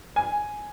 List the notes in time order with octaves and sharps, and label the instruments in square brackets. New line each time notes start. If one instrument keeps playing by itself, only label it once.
[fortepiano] G#5